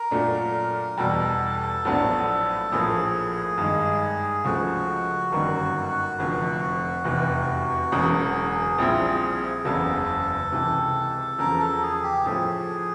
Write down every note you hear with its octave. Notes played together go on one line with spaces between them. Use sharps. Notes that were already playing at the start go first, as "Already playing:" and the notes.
Already playing: A#4
A#2 F#3 A3 D4
E2 B2 G3 A4
A#1 A2 F#3 B3 D4
A#1 A2 F3 A#3 G#4
G2 D#3 G#3
C#2 C#3 F3 A3 F#4
G1 F#2 D#3 G3 A#3
F1 F2 D3
F1 E2 C3 E3
E1 E2 C#3 F#3 G#4
A#1 A#2 G3 C4 E4
F#1 E2 C#3 F#3 B3 A4
C#2 C3 E3
E2 C#3 F3 A#4
A4
G#4
G4
A2 F3 A3 G#4